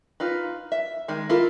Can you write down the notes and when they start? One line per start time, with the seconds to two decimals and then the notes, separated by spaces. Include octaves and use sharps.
0.20 D#4 F4 B4
0.72 E5
1.08 D#3 G#3
1.29 E4 F4 A4 A#4